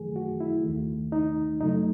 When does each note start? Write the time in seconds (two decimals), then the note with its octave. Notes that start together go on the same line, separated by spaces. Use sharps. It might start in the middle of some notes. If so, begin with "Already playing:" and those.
Already playing: F#2 D#3 F#3 A3 G#4
0.16 F#4
0.40 E4
0.64 D#2 D#3 A3
1.12 D#4
1.60 F#2 C#3 F#3 A3 D#4